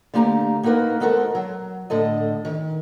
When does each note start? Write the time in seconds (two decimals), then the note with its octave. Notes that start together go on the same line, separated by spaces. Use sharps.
0.14 D3 A3 A#3 G4 A5 A#5
0.63 A#3 D#4 F#4 A#4 B4
1.00 G#3 B3 F#4 A4 A#4 C5
1.35 F#3
1.90 A2 D3 A4 D#5
2.45 D#3